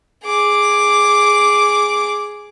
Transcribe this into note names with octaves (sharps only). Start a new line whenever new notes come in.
G#4 D6